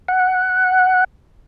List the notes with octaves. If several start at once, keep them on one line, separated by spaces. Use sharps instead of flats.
F#5